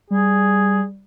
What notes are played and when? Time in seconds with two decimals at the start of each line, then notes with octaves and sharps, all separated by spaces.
0.11 G3 G#4